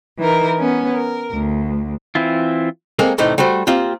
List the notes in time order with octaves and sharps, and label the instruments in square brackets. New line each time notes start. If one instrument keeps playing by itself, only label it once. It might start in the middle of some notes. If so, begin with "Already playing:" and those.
[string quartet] E3 D#4 A#4
B3 C#4
A#4
D2
[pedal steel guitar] E3 C4 E4 F4
[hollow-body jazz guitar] G#3 A#3 C4 A4 A#4
C2 A2 E3 A3 D#4 C5
G3 A3 F#4 C5
A#3 C4 F4 G4